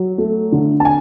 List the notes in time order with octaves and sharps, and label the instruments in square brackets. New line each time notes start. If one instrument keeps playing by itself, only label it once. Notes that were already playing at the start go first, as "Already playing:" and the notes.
Already playing: [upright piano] F#3
A3
D3
A5
G#5